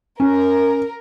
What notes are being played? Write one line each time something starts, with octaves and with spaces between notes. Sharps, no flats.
C#4 A#4